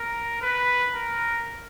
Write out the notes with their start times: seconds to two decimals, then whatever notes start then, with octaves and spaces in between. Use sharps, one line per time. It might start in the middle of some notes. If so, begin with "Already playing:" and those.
Already playing: A#4
0.42 B4
0.94 A#4